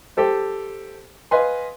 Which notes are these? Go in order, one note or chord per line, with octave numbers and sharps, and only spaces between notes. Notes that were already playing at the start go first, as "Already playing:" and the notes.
G4 A4 C5
B4 D#5 F5 G#5 C6